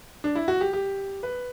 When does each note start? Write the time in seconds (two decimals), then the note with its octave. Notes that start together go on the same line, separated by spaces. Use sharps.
0.24 D4
0.35 E4
0.48 F#4
0.61 G4
0.73 G4
1.23 B4